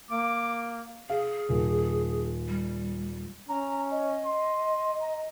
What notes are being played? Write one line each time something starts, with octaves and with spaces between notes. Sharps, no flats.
A#3 D6
G#4 F5
D#1
G3
C#4 A#5
D#5
C6
A#5